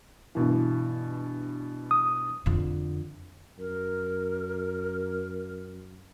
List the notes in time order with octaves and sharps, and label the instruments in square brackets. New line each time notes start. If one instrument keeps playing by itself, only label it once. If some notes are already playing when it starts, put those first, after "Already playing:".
[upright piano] G2 B2 E3
[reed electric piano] D#6
[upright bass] F2 D3
[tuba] F#2 [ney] A#4